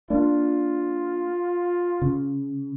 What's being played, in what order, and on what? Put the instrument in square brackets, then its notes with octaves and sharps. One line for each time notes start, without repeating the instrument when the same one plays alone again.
[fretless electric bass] A#3 D4 [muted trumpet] F4
[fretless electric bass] C#3